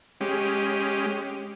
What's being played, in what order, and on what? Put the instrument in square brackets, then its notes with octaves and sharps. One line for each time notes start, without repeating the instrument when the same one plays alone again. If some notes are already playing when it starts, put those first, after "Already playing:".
[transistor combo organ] G#3 C#4 G4